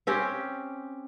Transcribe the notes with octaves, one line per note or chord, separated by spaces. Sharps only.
C4 C#4 G4